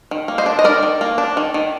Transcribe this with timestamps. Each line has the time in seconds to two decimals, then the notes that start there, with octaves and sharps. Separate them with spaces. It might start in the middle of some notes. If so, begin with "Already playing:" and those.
0.11 D#3
0.28 A#3
0.38 C5 D#5
0.46 D4
0.59 D#5
0.64 D#3 A#4 D5
0.83 D#3
1.01 A#3
1.18 D4
1.37 D#3
1.54 D#3